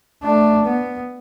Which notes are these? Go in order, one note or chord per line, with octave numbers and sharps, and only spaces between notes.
A3 D4
B3